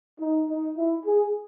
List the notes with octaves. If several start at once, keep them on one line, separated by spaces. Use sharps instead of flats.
D#4
D#4
E4
G#4